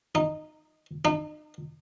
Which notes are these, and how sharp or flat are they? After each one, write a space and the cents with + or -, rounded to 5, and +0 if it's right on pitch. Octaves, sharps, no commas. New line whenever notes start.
D#4 -15
D#4 -40